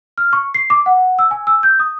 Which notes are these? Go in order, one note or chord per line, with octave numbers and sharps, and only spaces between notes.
F6
C#6
C7
D6
F#5
E6
G#5
E6
G6
D#6